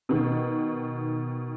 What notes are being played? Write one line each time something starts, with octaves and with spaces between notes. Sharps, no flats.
B2 D#3